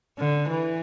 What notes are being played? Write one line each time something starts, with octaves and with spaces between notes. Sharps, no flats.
D3
E3